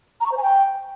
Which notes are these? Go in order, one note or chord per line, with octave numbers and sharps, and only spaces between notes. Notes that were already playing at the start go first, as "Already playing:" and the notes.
A#5
C#6
C5
G#5
G5